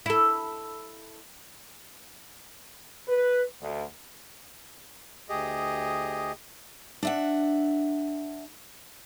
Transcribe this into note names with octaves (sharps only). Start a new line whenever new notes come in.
E4 A4
B4
D2
D2 G4 G#4 D#5
D4 E5 F#5